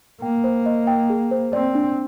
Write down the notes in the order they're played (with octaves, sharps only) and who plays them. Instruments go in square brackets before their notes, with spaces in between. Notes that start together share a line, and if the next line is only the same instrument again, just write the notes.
[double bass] A#3 [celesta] G5
[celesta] C5
D#5
G5
G#4
C5
[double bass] C4 [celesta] D5
[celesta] D4